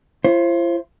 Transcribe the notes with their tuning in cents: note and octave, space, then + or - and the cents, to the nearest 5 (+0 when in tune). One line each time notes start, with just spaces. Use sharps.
F4 -45 C5 +25